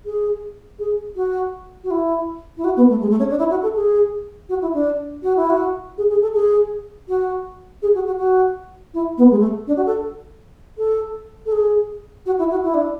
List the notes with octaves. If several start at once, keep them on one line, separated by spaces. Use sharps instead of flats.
G#4
G#4
F#4
F#4
E4
E4
F#4
B3
A3
G#3
A3
C#4
D4
E4
F#4
A4
G#4
F#4
E4
D4
F#4
E4
F#4
G#4
G#4
A4
G#4
F#4
G#4
F#4
F#4
F#4
E4
B3
G#3
A3
D4
F#4
A4
A4
A4
G#4
F#4
E4
F#4
E4
D4